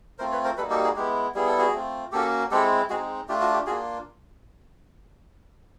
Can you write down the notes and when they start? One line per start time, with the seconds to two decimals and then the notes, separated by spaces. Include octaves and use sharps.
0.18 A3 C4 F4 A#4 C5
0.32 B4 C#5
0.44 A#4 C5
0.57 G3 A#3 D#4 F#4 A4 B4
0.70 G4 A4
0.84 F#4 G#4
0.96 G#3 B3 E4 G4
1.34 G3 B3 E4 G#4
1.47 A4
1.58 F#4 G#4
1.74 A3 C4 F4
2.12 A#3 C#4 F#4 G4 A4
2.51 G#3 C4 E4 G4 A4
2.89 G#3 C4 D#4 F#4 G#4
3.28 A3 D4 F4 G4
3.41 F#4
3.53 G4
3.66 A#3 D4 F4 F#4 G#4